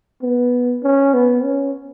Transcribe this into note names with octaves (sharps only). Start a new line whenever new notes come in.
B3
C#4
B3
C#4